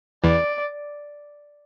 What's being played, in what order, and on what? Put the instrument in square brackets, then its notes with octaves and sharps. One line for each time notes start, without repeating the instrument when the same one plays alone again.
[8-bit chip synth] E2 E3 [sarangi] D5